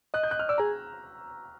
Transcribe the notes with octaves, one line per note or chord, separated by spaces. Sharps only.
D#5 F#6
G6
F#6
F6
D5 E6
G#4 A#5